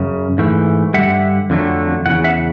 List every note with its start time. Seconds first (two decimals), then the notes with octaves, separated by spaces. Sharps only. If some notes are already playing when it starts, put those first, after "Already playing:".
Already playing: F#2 C#3
0.38 G#2 E3 A3
0.94 G2 D3 G3 E5 F#5
1.50 F2 D3 F#3 A3
2.06 E2 C#3 E3 F#5
2.24 E5 F#5